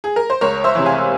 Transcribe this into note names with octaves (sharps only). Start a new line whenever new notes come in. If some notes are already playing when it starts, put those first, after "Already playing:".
G#4
A#4
C5
C#2 A#4 C#5
C5 E5
C3 E3
F5 G#5